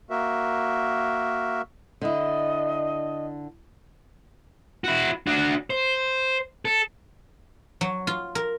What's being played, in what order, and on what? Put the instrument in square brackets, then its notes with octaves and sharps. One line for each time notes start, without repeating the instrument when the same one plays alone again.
[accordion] A#3 F#4 A#4 E5
[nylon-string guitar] D3 E4 [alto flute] D#5
[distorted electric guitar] E4 F#4
D4 F#4
C5
A4
[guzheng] F#3
F4
A#4